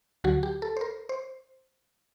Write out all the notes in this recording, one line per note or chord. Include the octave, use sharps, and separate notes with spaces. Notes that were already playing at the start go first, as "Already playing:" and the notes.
D2 D3 F#3 F#4
G4
A4
C5
A#4
C5